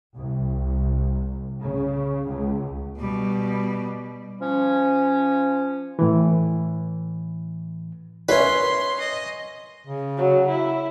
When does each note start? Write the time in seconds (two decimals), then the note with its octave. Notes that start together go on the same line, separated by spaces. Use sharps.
0.15 C2
1.62 C#3
2.28 C#2
2.98 B2 G3
4.39 F3 C#4
5.99 A2 E3
8.29 C#4 B4 C#5 E5 C6
8.99 D#5
9.87 C#3
10.17 F#3
10.49 E4